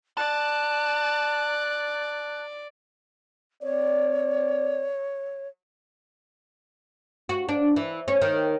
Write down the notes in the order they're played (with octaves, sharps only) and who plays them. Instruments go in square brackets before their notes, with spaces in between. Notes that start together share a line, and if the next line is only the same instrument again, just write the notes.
[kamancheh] D5 [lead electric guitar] A5 [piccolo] F#6
[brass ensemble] C4 D5 [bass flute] C#5
[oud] F#4
D4
E3
C#4
D#3